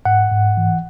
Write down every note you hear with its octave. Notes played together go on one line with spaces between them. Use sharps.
G#2 F#5
G#2
E3